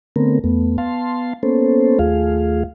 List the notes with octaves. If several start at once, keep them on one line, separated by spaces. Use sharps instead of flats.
D3 A3 B3 C4 A#4
E2 A3 B3
B3 F5 A5 C6
A#3 B3 C#4 A4 C5
D#2 A3 F4 G#4 F5